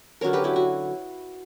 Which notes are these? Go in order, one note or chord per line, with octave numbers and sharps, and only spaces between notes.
D3 F#3 C#4 A#4 C#5
G4 B4
E4 G4
F#4